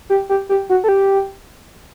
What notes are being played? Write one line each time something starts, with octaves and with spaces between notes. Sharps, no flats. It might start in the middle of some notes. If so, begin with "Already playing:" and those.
G4
G4
G4
F#4
A4
G4